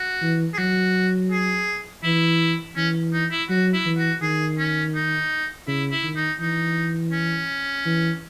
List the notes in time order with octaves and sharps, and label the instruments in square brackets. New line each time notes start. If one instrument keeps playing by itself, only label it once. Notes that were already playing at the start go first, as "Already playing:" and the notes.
Already playing: [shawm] F#4
[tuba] E3
[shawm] G#4
[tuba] F#3 [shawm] F#4
[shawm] G#4
[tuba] E3 [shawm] E4
[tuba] E3 [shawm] C#4
[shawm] D#4
E4
[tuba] F#3 [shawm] F#4
[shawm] E4
[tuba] E3
[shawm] F#4
[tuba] D#3 [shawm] G#4
[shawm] C#4
D#4
[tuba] C#3 [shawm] E4
[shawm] E4
[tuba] D#3
[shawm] D#4
[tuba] E3 [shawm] D#4
[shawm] C#4
[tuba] E3